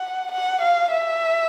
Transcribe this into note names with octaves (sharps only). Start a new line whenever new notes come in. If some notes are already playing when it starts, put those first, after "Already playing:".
Already playing: F#5
F#5
F5
E5